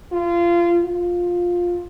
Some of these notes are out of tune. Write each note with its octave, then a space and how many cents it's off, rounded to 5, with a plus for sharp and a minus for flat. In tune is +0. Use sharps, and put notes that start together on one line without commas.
F4 -25
F4 +10